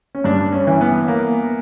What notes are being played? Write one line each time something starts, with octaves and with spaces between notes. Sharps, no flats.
C#4
G2 D4
C#4
E3
B3
A#3